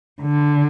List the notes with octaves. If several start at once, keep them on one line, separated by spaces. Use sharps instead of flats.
D3